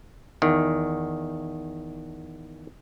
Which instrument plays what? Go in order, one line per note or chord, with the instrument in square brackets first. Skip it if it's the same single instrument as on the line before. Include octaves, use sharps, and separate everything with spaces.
[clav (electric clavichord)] E2 D#3